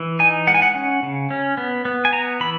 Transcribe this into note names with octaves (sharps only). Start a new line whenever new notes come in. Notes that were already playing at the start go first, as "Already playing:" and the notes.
Already playing: E3
D#4 G#5
G#3 F#5
G#5
F#5
C#4
C#3
C#4
B3
B3
G#5
B3 A#5
E3 B5